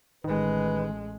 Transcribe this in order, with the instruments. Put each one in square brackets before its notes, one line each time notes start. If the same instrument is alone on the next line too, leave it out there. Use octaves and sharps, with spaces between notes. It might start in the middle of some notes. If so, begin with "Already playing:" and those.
[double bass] A1 G#3 [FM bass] D#3 [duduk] B4